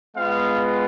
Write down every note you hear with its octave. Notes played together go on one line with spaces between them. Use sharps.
G#3 B3 F4 F5